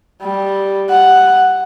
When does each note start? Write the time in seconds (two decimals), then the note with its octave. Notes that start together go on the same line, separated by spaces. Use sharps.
0.22 G3
0.90 F#5